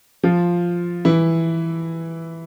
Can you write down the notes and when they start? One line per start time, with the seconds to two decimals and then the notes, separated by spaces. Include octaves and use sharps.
0.23 F3 F4
1.05 E3 E4